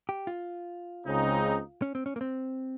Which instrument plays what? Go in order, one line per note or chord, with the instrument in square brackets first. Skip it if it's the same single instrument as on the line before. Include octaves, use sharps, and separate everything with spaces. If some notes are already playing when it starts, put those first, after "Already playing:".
[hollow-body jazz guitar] G4
F4
[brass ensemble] C#2 C#3 G#3 C4 D#4
[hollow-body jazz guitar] C#4
C4
C#4
A#3
C4